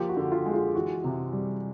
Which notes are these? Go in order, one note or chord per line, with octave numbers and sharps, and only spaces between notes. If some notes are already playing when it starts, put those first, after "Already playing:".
Already playing: F3 A#3 G4
F#4
D3
F4
G#3
F4
E3 F#4
C3
G3